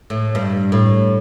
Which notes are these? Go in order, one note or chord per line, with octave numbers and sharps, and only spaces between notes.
A2
G2
A2